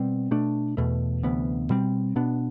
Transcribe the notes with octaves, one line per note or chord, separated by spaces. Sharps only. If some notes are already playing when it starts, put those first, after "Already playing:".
Already playing: B2 G3 C4
B2 A3 D4
E2 B2 A3
D2 C3 E3 B3
B2 G3 C4
B2 B3 D4